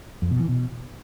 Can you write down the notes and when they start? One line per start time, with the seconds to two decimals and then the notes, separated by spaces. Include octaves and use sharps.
0.22 F2
0.31 B2
0.40 E3
0.49 B2